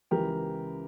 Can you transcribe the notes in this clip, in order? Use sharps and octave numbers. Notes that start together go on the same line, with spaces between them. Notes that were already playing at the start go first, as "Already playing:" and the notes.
C#2 C#3 E3 G4 A#4